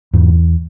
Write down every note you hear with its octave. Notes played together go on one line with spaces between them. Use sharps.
E2 G#2